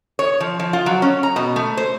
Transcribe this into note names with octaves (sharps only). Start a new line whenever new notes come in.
C#5
F3
F3
F4
F#3
C#4
A#5
B2
A3
C5